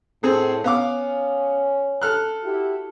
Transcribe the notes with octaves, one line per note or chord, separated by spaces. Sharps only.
A2 C4 G#4 A4
B3 C#4 F5 D6
A4 F6 F#6
E4 F#4 G4